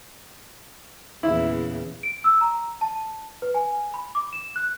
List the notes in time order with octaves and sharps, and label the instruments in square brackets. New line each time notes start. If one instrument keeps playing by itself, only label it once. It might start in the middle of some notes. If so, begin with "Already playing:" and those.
[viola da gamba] E2 A#2 C#3 [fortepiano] E4
[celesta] D7
E6
A#5
A5
B4
G#5
B5
D6
E7
F#6